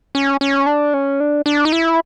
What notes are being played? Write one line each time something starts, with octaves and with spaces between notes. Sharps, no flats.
C#4
C#4
D4
C#4
D4
D4
D#4
E4